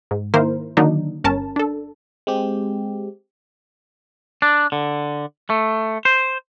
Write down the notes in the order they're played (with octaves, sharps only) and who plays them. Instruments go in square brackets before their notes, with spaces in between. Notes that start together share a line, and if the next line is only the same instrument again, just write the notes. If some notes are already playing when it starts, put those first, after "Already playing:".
[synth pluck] G#2
D#3 A#3 E4 A#4 C5
D3 D#3 F#3 A#3 D4 D#4
G1 C#4 A#4 A5
D4 A4
[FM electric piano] G#3 C4 G4
[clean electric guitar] D4
D3
A3
C5